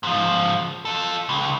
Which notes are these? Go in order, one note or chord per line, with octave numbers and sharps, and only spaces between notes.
G#2 F3
F4 A4
C#2